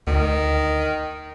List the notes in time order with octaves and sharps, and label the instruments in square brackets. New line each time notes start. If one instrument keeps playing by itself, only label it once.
[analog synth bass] D2 [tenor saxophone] D#3